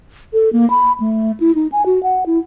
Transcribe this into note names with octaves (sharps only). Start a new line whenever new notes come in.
A4
A#3
B5
A3
E4
D#4
G#5
F#4
F#5
E4